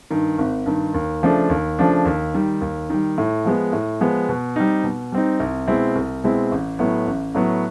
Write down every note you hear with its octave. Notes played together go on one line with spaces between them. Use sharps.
G2 D#3
G#1
G2 D#3
D#2
C#3 F3 A3 D4
D#2
C#3 F3 A3 D4
D#2
D#3 G3
D#2
D#3 G3
A2
F3 G#3 B3
A2
F3 G#3 B3
B2
G3 C4 D#4
B2
G3 C4 D#4
C2
B2 G#3 C4 E4
C2
B2 G#3 C4 E4
A1
A2 F#3 B3
A1
A2 F#3 B3